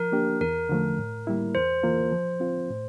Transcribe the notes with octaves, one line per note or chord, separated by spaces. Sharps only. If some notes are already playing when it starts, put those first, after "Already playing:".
Already playing: F3 A#4
A#3 D4 G4
E2 A#4
D3 F3 A3
A2
G3 A#3 E4
E2 C5
E3 A#3 F4 A#4
F3
C4 F4
A2